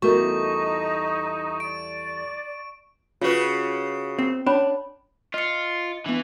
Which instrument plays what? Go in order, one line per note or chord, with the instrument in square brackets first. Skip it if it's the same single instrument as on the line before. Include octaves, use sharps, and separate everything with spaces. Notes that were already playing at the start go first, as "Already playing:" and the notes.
[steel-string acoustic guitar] E2 G3 A3 [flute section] D#4 [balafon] F#4 A#4 [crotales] C#6
[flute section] D5 [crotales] D7
[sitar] C#3 F#4 [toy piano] F4 B4
[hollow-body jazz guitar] C4
[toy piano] C#4 C#5 B5 [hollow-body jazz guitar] D4
[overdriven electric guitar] F4 [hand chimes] D#5 C#7
[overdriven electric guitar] E3 [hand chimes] B3 D4